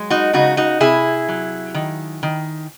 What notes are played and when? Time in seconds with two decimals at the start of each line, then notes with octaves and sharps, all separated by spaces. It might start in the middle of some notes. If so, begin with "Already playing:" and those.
Already playing: F#3 G#3
0.10 D#4 F#4
0.33 C#3 D#4 F#4
0.57 D#4 F#4
0.80 C3 E4 G#4
1.28 F#3
1.74 D#3
2.23 D#3